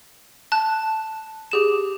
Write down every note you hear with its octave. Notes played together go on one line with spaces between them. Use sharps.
A5 F#6
G4 G#4 E7